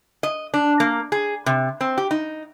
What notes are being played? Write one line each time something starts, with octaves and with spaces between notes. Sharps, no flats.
D#5
D4
A#3
G#4
C3
C4
G4
D#4